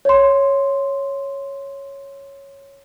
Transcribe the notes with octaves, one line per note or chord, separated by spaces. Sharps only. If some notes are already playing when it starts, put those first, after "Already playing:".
C#5 C6